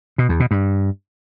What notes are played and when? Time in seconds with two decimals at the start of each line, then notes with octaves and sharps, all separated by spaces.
0.18 B2
0.29 E2
0.40 B2
0.51 G2